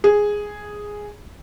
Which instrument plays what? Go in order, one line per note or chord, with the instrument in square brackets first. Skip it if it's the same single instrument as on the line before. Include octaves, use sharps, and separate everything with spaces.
[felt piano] G#4